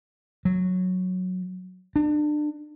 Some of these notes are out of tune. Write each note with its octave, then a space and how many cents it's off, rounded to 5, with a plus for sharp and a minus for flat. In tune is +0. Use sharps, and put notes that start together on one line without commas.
F#3 -10
D4 +30